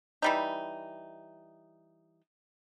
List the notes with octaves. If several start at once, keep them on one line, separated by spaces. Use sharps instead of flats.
E3 G3 D#4